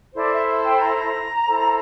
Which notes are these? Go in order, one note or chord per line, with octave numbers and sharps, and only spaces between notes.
E4 A4 C5 D5
E5
G5
A#5
E4 A4 C5